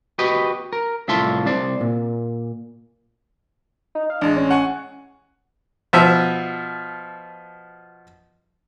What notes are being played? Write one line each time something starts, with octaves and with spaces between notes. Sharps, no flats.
F#4 G4 B4 D#5
A#4
C2 A2 F4 E5 A5 C6
C2 C3 C5 D5
A#2
D#4
F5
A1 G#3 D4
C#4
F#5 G#5 C#6
B2 F3 E5